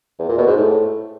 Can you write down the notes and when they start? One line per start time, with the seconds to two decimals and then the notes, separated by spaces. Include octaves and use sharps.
0.19 E2
0.29 A#2
0.38 B2
0.48 G#2
0.57 A2